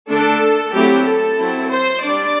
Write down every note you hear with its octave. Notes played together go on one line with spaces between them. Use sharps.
D3 A3 D4 A4
F#3 A3 C4 E4 G4
A4
F#3 C4 E4
C5
G3 D4 D5